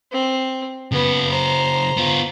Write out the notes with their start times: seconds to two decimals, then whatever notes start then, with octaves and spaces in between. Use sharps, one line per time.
0.12 C4
0.92 C#3 B3 F#4
1.31 C5 A#5
1.97 B3 F4